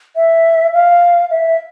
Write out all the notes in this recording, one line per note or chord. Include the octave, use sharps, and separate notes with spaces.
E5
F5
E5